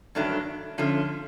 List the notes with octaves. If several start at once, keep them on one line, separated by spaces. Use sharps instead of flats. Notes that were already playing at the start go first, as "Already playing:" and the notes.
G2 D#3 F#3 A3 D4
D3 F3 A3 C#4